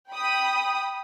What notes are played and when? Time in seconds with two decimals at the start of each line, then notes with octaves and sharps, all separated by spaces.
0.11 G5 B5 D#6